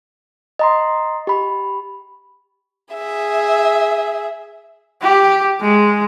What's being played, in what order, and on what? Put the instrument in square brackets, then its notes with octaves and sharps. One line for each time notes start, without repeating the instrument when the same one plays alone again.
[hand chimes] D#5 A#5 C6
G4 B5
[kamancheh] G#4 E5
[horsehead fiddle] G4
G#3